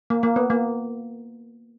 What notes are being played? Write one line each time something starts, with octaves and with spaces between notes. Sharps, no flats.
A#3
A#3
B3
A#3